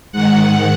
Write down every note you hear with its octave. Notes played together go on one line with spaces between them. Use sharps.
G#2 D#3 F#5